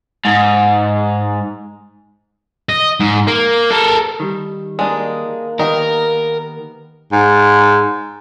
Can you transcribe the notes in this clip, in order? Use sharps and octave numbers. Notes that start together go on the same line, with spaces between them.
G#2
D#5
G#2
A#3
A4 A#4
D#3 G3
G#3 A#3 D4 D#4
D#3 B3 G4 A#4 D#5
G#2